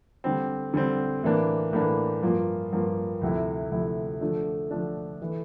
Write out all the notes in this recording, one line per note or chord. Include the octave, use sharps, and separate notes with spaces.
D3 G3 C4
D3 G3 C4
A2 E3 A#3 D4
A2 E3 A#3 D4
G2 F3 A#3 F4
G2 F3 A#3 F4
D2 C3 F3 A3 E4
D2 C3 F3 A3 E4
D3 F3 A3 D4
D3 F3 A3 D4
E3 A3